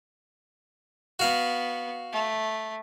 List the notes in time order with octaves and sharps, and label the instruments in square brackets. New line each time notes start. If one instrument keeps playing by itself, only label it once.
[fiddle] B3 [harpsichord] F#4 F5
[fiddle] A3